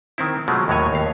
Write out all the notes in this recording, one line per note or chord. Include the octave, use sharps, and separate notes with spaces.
D#3 C4 E4
B2 F3 F#3 G#3 A3
D#2 A2 F#3 C#5 G#5
D#2 F5